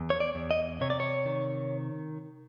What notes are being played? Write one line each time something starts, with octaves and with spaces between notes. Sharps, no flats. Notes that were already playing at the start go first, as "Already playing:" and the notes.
Already playing: E2
C#5
D5
E2
D#5
C3 C#5
D5
C#5
D#3